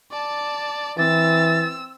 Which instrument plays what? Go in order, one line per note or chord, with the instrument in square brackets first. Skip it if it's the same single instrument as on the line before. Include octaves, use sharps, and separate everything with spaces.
[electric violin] D5 A5
[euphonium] E3 [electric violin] C4 E6 [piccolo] A6